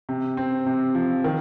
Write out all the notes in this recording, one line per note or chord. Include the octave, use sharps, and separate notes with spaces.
C3
C4
C3
F3
D#3